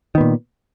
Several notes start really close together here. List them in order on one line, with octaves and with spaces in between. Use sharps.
D#3 B3 A#2